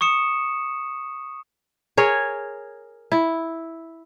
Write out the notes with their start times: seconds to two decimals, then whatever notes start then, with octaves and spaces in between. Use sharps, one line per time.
0.01 C#6 D#6 C#7 E7
1.97 G#4 A#4 C#5
3.12 E4